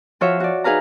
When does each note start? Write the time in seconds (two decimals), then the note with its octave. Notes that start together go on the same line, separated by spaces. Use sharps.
0.21 F3 F4 F#4 C#5 E5
0.40 F#4 D5
0.64 D#4 G#4 B4 F5 A#5